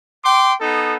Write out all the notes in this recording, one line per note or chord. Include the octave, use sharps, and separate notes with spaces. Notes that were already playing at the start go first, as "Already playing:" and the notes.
G5 C6 D6
B3 D#4 A4